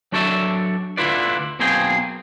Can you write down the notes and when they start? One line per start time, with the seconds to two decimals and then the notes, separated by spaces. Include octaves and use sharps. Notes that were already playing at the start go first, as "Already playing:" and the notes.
0.12 F#3 D4 F#4 A4 D5 E5
0.97 D2 D3 E4 F4 B4 D5
1.59 B1 B2 A#3 C4 G#4 G5